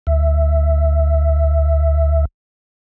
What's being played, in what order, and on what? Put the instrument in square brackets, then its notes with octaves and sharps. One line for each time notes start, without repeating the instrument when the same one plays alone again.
[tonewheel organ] D2 E5